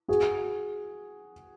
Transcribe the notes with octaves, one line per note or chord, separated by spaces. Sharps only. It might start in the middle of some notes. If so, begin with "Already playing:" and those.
F#4 G#4